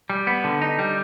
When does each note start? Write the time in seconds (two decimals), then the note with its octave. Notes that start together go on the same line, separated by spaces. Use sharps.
0.10 G3
0.27 B3
0.44 D3
0.62 D#4
0.79 G3